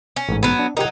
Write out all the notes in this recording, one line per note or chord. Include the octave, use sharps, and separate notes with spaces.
C#4
A1 G#2
F#3 B3
D4
F#3 D#4 G4 A#4